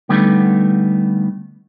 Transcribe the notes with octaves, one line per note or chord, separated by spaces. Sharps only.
D3 G3 A3 B3 D#4